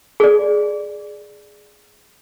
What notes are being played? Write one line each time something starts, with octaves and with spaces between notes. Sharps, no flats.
G#4 D5